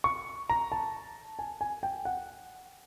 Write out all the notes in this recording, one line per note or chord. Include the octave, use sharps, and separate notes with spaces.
C#6
A#5
A5
G#5
G#5
G5
F#5